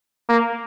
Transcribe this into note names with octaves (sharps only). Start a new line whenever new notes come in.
A#3